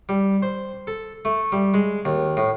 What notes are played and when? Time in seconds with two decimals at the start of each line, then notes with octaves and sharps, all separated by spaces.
0.09 G3
0.42 C5
0.87 A4
1.25 A3
1.52 G3
1.74 G#3
2.05 D#2
2.37 A2